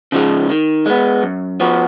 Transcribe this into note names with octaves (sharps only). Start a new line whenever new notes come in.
C#3 F3 G#3
D#3
G#3 B3
F#2
F3 B3 F#4